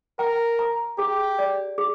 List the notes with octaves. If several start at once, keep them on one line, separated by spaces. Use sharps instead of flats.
A#4 G5
A#5
G4 G#4
D5
G#4